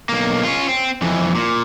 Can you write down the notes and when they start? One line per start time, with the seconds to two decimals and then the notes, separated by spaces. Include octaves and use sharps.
0.09 B1 A#3
0.43 C#4 F4
0.69 C4
1.02 F2 E3
1.35 A#2